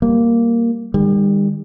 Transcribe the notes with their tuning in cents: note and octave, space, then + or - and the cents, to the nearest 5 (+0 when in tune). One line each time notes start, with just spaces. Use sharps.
G3 +0 A#3 +0
D#3 -25 G3 +35